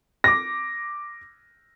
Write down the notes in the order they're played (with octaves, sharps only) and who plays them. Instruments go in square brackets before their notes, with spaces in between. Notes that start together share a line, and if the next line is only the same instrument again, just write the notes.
[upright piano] D6 A#6